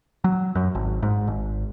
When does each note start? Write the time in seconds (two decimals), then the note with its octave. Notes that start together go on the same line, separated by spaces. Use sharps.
0.24 F#3
0.55 F#2
0.75 G#1
1.03 G#2
1.27 G#1